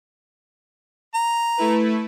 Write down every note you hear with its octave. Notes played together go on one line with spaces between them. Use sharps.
A#5
A3 E4 B4